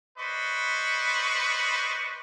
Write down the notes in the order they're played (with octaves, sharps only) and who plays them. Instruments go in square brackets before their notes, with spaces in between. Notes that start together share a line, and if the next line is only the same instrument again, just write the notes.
[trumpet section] B4 C5 D5 D#5 B5 C#6